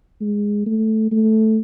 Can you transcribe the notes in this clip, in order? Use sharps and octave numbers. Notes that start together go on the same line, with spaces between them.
G#3
A3
A3